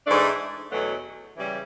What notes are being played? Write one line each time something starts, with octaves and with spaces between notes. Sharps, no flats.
G#2 E3 A3 D4
E2 B2 F#3 A3
C#3 E3 G3